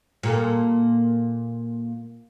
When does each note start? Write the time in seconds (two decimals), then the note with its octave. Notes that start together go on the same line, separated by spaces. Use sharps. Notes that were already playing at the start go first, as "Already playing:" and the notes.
0.23 A#2 A#3 A4